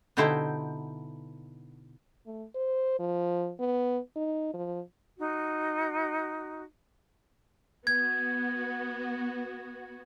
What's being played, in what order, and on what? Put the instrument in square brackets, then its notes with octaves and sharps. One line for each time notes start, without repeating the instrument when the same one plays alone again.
[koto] B2 D3 D#4 E4 G4 C5
[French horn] A3
C5
F3
B3
D#4
F3
[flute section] D#4 F#4
[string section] B3 F#4 [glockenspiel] G#6